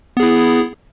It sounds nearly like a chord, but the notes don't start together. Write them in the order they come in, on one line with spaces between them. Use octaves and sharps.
B3 G#4 E4